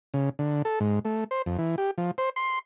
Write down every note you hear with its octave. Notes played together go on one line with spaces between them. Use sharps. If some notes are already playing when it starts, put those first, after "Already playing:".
C#3
D3
A4
G#2
A3
C5
F2
E3
G4
F3
C5
C6